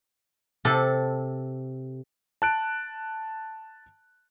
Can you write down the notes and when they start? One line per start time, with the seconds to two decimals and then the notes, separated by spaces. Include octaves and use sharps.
0.65 C3 A4
2.42 A5 F#6 D7